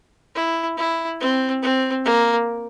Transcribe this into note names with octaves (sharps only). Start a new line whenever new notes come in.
E4
E4
C4
C4
A#3